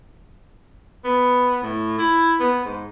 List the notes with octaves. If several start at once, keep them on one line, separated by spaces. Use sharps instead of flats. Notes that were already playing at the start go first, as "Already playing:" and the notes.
B3
A2
E4
B3
G#2